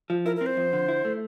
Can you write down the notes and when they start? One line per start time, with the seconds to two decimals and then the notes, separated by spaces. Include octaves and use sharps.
0.10 F3
0.26 E4 A#4
0.36 A#4
0.41 C4
0.46 C5
0.57 F2
0.73 D3
0.88 E4
1.05 A3